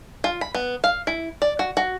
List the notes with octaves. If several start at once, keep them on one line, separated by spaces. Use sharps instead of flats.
F4
B5
B3
F5
E4
D5
F#4
F#4